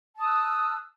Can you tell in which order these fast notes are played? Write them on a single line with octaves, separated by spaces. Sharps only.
A5 D#6 E6 F#6